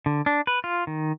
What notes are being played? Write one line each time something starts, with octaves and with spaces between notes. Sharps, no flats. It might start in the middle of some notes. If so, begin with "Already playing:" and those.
D3
D4
B4
F4
D#3